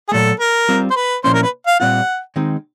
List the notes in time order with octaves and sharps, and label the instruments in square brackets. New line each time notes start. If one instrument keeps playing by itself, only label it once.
[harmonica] G#4
[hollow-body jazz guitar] A#2 F#3 A3 [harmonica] A4
[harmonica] A#4
[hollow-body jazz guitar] G3 C4 F4
[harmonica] C5
B4
[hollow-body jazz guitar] A#2 F3 A#3 C#4 E4 [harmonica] C5
[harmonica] A#4
B4
F5
[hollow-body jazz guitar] A#2 G3 C4 F4 [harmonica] F#5
[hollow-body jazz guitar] D#3 G#3 C4 D#4